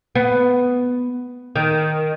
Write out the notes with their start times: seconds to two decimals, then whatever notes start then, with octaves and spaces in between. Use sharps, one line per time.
0.15 B3
1.56 D#3